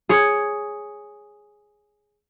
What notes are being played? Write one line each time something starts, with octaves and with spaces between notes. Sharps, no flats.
G#4 C#5